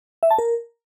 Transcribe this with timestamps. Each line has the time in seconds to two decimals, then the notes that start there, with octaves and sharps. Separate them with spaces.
0.23 E5
0.31 A5
0.38 A#4